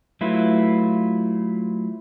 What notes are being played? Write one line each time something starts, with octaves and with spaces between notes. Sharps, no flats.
F#3 A3 E4 F4 B4